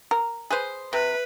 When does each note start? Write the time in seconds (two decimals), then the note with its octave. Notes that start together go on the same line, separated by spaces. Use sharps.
0.11 A#4
0.50 G#4 B4 C5
0.93 C3 B4